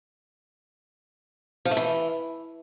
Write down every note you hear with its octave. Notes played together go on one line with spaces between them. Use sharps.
F3
A3
E3